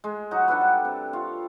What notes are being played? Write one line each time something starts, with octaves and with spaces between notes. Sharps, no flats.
G#3
F#3 D#4 F#4
D4 F#4 A4 B4
G3
C3
F4 C#5